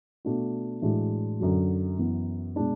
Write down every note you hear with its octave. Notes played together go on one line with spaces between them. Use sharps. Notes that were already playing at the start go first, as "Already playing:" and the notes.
B2 A3 D4 F#4
A2 E3 G#3 D4 F#4
F#2 D3 F#3
F#2 E3 B3
B2 G#3 D4